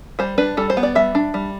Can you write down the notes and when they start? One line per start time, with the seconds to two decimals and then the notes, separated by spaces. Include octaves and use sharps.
0.19 G3 C5
0.38 D4 B4
0.57 G3 A4
0.70 C5
0.77 B3
0.83 D5
0.95 G3 E5
1.15 D4
1.34 G3